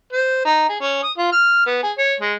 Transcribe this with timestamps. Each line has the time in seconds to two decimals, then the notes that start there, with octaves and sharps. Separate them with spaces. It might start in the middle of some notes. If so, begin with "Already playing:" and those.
0.13 C5
0.45 D#4
0.69 G#4
0.81 C#4
1.03 D#6
1.18 F4
1.32 F6
1.66 B3
1.83 G#4
1.98 C#5
2.20 G#3